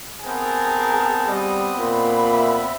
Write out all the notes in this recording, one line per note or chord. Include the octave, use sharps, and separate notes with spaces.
B3 C4 D#4 G#4 A#4 A5
G3 D#5
A#2 B5
E5